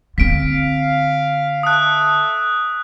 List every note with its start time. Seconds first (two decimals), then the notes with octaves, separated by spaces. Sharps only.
0.18 D3 C4 F5 B6 D7
1.63 A4 E5 A5 D#6 F#6